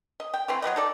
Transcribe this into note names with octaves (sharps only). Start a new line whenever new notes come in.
D#5
G5
E3 A3 C4
F#3 G3 B4 D#5
D#4 A4 D5